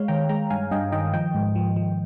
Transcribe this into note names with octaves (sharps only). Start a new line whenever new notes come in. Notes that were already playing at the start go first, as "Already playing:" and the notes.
Already playing: G#3 C#5 F5
D#3 G5 A#5
G#3 G5 A#5
G2 F5 G#5
G2 D#5 G5
D#3 D#5 G5
F3 D#5 G5
G#2
F3
F3